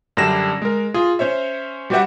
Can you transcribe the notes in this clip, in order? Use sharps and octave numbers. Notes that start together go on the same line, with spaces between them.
F#2 D3 G3 D4 A#6 E7
G#3 A#4
F4 G#4
C#4 C5 C#5 E5
G3 F#4 G4 B4 E5 F#5